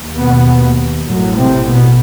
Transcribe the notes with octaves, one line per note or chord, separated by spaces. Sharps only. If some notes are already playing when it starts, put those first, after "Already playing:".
Already playing: D#2
B2 B3
A1 F#2 A2 F#3
C3 C4
B2 B3